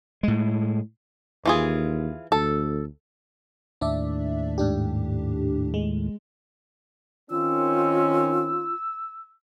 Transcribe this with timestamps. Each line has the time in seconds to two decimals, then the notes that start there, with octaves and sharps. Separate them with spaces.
0.23 A2 G#3
1.46 D#2 E3 F4 G#4
2.32 D2 A4
3.81 D#2 A2 D4 D5 E5
4.58 G#2 D4 G4
5.74 G#3
7.30 D#3 C4 C#4 F4 E6